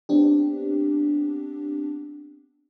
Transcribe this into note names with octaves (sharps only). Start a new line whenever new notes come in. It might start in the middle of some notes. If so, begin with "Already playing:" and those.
B3 C4 D4 G4